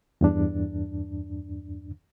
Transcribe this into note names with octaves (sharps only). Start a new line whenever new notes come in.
E2 G2 D4